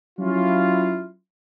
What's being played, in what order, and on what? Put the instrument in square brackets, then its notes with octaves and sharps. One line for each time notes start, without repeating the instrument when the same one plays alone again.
[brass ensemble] F#3 C#4 E4 F4